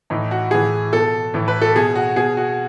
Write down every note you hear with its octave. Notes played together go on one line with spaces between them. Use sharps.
A2 E3 D#4
F#4
A2 E3 G#4
B2 A4
A2 E3
B4
A4
B2 G#4
F#4
B2 G#4
F#4